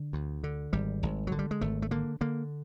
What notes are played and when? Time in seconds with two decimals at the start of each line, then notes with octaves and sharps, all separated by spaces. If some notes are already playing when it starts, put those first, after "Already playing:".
Already playing: D3
0.13 D2
0.44 D3
0.73 G#1 G3
1.03 G#1
1.27 D3 F#3
1.39 G3
1.51 G#3
1.61 G#1 A3
1.82 A3
1.91 D3 A#3
2.21 D3 A#3